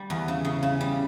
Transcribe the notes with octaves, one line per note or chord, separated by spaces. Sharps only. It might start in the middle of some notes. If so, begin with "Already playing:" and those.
Already playing: G3
E2
C#3
C#3
C#3
G3